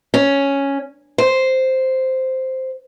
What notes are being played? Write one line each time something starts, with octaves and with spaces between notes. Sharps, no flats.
C#4
C5